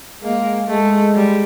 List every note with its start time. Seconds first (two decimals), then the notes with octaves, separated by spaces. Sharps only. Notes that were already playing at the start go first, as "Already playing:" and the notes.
0.22 G#3 A#3
0.68 G#3 A3
1.14 G3